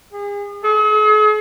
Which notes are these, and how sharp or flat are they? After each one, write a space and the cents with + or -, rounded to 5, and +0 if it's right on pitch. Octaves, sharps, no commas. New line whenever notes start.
G#4 -35
G#4 +45